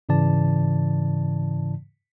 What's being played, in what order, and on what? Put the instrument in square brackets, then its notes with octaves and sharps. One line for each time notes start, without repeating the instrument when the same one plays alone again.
[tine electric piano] G#2 C#3 E3 D5 A5